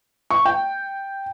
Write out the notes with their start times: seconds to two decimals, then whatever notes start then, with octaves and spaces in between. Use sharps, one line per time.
0.31 C#6
0.45 G5